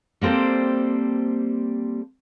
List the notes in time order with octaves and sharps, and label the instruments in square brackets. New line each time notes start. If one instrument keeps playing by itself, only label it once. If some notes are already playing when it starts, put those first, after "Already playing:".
[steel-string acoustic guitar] G3 A#3 C4 A4 C5